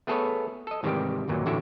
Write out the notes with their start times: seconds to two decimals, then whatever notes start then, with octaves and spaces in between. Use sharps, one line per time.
0.07 A3 B3 G#4 A4 B4 C#5
0.67 A4 D#5
0.83 G#2 C3 D#3 E3 G3 G4
1.28 G1 D#2 A#2 F#3
1.46 A1 A2 D3 F#4 G4 E5